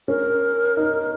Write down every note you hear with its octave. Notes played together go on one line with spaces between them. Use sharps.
C#4 A#4
D#4